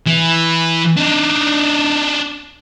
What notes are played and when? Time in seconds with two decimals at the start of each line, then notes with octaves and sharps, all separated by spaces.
0.06 E3
0.97 D4 D#4